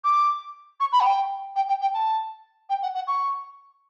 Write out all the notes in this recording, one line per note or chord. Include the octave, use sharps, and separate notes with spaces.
D6
C#6
B5
F#5
G5
G5
G5
G5
A5
G5
F#5
F#5
C#6